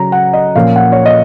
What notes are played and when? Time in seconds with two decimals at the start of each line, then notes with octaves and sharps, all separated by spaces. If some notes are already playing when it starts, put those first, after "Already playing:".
Already playing: C#3 F#3 C#4 A#5
0.12 F#5
0.33 D#5
0.55 A#2 F3 A#3 C#4 F5
0.76 F#5
0.92 C#5
1.06 D#5